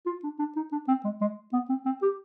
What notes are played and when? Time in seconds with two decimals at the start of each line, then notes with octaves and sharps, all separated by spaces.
0.06 F4
0.24 D4
0.39 D4
0.56 D#4
0.72 D4
0.88 C4
1.04 G#3
1.21 G#3
1.53 B3
1.69 C4
1.86 C4
2.02 G4